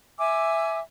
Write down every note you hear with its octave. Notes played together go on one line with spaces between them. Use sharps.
E5 G#5 D6 E6